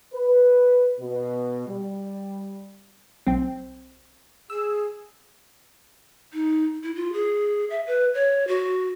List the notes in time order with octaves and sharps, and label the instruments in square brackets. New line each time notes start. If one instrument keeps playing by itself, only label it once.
[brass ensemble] B4
B2
G3
[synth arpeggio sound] B1 G5 [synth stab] C4
[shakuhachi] G#4 [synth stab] E6
[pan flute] D#4
E4
F4
G#4
E5
B4
C#5
F#4